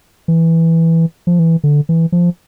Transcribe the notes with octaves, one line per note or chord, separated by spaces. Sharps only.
E3
F3
E3
D3
E3
F3